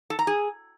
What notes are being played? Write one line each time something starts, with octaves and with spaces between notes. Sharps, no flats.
A4
A#5
G#4